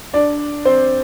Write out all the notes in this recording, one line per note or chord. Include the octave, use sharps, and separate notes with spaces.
D4 D5
C4 C5